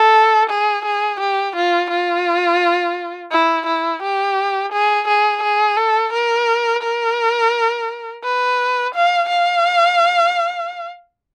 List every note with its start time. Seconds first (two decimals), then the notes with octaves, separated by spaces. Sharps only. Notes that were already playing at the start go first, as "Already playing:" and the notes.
Already playing: A4
0.49 G#4
0.85 G#4
1.20 G4
1.56 F4
1.90 F4
3.31 E4
3.66 E4
4.02 G4
4.71 G#4
5.08 G#4
5.43 G#4
5.77 A4
6.13 A#4
6.82 A#4
8.23 B4
8.95 F5
9.29 F5